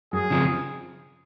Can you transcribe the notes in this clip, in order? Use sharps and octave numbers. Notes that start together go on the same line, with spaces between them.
F#2 G#4
C#3 F3 C4